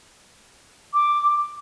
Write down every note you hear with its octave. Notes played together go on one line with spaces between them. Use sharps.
D6